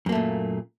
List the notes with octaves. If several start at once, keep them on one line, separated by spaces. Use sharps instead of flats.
F#2 A#2 A3 A#3